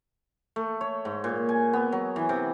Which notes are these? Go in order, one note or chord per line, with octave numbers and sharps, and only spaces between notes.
A3
C#5
G#2
A#2
G#5
B3
F#3
E3
C3